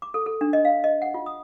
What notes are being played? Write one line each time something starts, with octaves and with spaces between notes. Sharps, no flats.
D6
A4
A4
D4
D#5
F5
D#5
F#5
F4
D#6